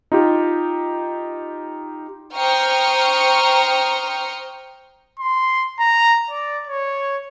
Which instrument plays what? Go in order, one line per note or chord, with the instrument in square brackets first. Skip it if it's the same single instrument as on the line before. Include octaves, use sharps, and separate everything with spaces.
[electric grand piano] D#4 F4 G4
[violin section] C5 G5 A#5 C#6 D#6 F6
[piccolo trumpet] C6
A#5
D5
C#5